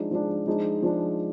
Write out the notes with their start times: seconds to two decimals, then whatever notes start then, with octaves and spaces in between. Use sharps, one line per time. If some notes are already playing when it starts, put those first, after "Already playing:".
Already playing: F3 G#3 D4 D#4
0.11 F3 G#3 D4
0.46 F3 G#3 D4 D#4
0.82 F3 G#3 D4